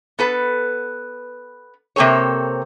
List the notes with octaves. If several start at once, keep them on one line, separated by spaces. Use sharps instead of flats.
B3 A4 B4
C3 A#3 C4 A4 C#5